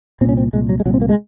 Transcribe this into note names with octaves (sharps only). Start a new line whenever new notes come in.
C2 A#2 C4 C#4
C4
C2 A#2 G#3
F#3
G#3
C2 A#2 F#3
C4
A#3
G#3